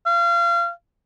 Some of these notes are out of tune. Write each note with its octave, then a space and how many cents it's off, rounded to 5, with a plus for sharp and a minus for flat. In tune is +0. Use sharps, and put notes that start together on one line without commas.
F5 -30